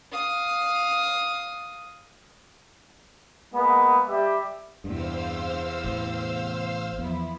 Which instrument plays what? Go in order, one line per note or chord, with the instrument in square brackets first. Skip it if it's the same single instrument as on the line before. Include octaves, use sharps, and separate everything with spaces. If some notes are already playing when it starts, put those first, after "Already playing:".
[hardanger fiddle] F5 D#6
[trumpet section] G#3 A#3 B3
G3 G4 E5
[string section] E2 C3 [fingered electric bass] G2 [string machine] C5 F5 E6
[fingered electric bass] A1
[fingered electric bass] E2 [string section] F3 B3 E4